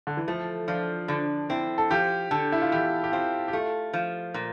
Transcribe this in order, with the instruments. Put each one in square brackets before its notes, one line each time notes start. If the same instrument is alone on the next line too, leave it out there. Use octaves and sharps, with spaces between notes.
[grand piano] D3
E3
[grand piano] F3 [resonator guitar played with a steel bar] A3
[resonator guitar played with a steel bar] F3 [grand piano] D4
[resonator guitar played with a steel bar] D3 [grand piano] D4
[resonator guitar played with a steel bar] C4 [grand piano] E4
[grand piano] A4
[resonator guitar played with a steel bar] F3 [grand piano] G4
[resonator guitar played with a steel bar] D3 [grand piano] A4
[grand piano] E4
F4
[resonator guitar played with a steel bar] E2 [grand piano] G4
[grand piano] G4
[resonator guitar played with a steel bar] C4 [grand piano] F4
[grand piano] G4
[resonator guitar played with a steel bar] A3 [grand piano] F4
[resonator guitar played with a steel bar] F3
A#2